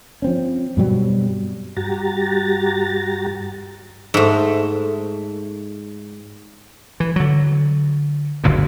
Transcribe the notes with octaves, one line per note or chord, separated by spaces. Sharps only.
F3 C4 C#4
G2 B2 F#3 G3
G2 F#4 G4 A#5 A6
G#2 A3
E3
D3 F#3
F#1 D2 G2 A#2